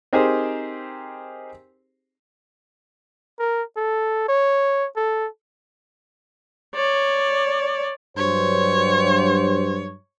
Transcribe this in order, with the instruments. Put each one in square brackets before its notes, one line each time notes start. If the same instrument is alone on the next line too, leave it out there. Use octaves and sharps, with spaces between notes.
[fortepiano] C4 D#4 G4 G#4 A#4 C5
[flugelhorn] A#4
A4
C#5
A4
[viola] C#5 D5
[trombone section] G2 F#3 [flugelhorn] C5 [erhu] C#5